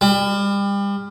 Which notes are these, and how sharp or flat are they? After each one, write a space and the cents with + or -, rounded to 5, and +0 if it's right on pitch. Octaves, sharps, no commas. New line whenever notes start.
G3 +35